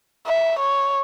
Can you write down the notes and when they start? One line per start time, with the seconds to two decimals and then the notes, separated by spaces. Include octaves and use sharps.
0.27 E5
0.59 C#5